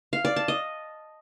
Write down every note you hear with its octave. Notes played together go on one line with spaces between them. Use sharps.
F5
D5
A5
D#5